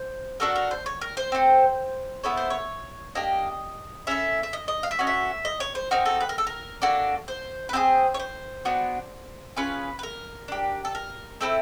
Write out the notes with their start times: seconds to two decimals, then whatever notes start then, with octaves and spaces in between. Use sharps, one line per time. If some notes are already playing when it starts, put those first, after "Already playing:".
Already playing: C5
0.40 D4 F#4 A4 A#4
0.56 A#4
0.71 C5
0.86 C#5
1.01 A#4
1.17 C5
1.32 C4 F4 A4
2.24 B3 E4 A4 C#5
2.37 C5
2.50 C#5
3.15 A#3 D4 G4 D#5
4.07 C#4 E4 A4 E5
4.43 E5
4.53 D#5
4.68 D#5
4.83 F5
4.91 E5
4.99 C#4 F#4 A4 D#5
5.07 E5
5.45 D#5
5.60 C#5
5.75 C5
5.91 C4 D#4 F#4 A#4
6.06 A4
6.21 B4
6.29 A#4
6.38 A4
6.47 A#4
6.82 A#3 D4 F#4 A4
7.28 C5
7.69 B4
7.73 C4 F4 G#4 C5
8.14 C#5
8.19 C5
8.65 B3 D4 F#4
9.57 C#4 F4 G#4 B4
9.99 B4
10.03 A#4
10.48 D4 G4
10.85 A4
10.95 A#4
11.41 A3 C4 E4 A4